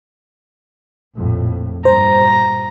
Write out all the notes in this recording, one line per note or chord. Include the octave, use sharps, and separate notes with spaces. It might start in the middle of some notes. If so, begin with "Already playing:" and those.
A#1 F2 A2
G2 A#2 C5 A#5